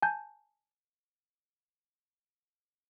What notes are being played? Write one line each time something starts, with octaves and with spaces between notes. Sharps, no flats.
G#5 A5 G6